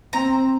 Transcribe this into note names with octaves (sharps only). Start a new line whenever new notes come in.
C4 A#5